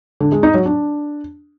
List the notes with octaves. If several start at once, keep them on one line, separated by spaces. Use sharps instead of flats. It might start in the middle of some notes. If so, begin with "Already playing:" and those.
D3
G#3
D#4
F#3
D4